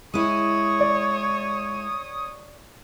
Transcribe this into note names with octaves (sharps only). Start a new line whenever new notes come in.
G#3 E4 C#5 D#6
D5